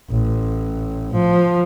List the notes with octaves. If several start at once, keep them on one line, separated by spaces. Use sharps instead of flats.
A1
F3